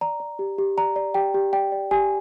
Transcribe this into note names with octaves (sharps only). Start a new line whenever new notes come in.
D5 A#5
D5
G4
G4
D5 A#5
D5
G4 G5
G4
D5 G5
D5
G4 G#5